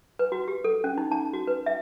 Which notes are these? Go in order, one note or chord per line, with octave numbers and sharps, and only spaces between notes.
B4
F#4
G4
A4
C#4
D#4
A5
F#4
B4
E5